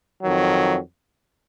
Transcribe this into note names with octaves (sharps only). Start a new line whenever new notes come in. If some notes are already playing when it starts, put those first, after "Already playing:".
F2 D#3 F#3